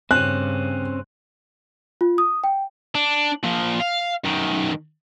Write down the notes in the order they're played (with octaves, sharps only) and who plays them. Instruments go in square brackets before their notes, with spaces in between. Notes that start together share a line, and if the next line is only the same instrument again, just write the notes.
[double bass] G2 C#3 [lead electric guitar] C4 C#4 [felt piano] F#6
[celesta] F4
D#6
G5
[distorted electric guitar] D4
A#2 F3
F5
F#2 D#3